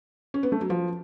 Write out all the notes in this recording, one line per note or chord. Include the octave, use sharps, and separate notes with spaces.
C#4
B3
A3
F#3
F3